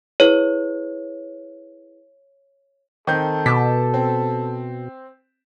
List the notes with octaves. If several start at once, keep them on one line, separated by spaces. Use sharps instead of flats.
E4 G#4 B4 C#5
D#3 C4 A4 G6
B2 A5 D6 B6
C4